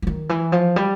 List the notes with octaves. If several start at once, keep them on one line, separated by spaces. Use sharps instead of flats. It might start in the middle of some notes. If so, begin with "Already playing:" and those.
E3
D#3
E3
F3
G3